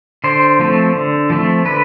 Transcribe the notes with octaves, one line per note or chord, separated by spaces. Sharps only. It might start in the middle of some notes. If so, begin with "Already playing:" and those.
D3 C5
F3 A3 C4
D3
F3 A3 C4
D3 B4